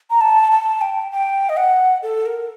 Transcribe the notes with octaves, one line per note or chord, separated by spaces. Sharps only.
A#5
A5
A5
G5
G5
D#5
F#5
A4
A#4